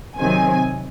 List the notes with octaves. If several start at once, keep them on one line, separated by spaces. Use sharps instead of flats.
C3 D#3 F#3 C4 G#5